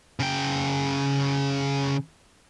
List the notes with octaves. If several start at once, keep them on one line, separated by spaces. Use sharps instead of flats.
C#3 G5